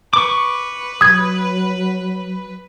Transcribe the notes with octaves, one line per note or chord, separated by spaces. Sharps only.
B4 C#6 D6
F#3 D#6 G#6